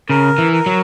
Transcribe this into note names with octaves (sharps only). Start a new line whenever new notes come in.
C#3 A#4
E3
A#4
F#3